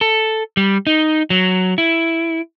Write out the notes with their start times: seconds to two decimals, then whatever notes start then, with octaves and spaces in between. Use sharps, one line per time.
0.01 A4
0.57 G3
0.87 D#4
1.30 F#3
1.78 E4